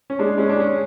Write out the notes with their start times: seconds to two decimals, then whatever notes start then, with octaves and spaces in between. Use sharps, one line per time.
0.10 C#4
0.19 G#3 D4
0.38 G#3 C#4
0.49 D4
0.57 G#3 C#4